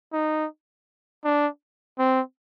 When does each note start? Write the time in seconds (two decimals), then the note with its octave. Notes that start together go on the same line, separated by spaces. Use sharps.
0.13 D#4
1.25 D4
1.98 C4